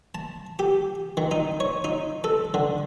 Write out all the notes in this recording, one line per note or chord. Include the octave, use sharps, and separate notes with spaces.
A5
G4
D#3
D#4
C#5
D#4
A4
D3